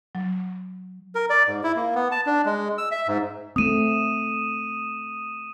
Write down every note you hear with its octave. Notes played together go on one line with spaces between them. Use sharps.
F#3
A#4
D5
G#2
E4
A#3
B3
A5
D4
G#3
E6
E5
G#2
A3 C4 D#6 D#7 E7